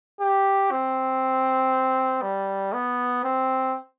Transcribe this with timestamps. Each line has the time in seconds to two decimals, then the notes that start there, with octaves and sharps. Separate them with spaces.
0.21 G4
0.71 C4
2.22 G3
2.73 B3
3.24 C4